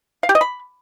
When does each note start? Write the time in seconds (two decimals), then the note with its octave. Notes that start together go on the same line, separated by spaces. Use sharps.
0.23 F5
0.29 G4
0.35 D#5
0.41 B5